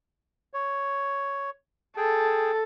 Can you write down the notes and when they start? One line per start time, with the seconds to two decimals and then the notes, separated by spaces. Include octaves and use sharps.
0.54 C#5
1.97 G#4 A4 G5